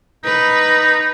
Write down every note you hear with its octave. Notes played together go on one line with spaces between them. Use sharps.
D#4 B4